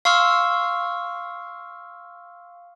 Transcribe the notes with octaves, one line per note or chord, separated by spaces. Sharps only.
F5 C6 C#6 E6 F6